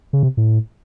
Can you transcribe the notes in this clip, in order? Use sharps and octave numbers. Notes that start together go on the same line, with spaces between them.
C#3
C3
A2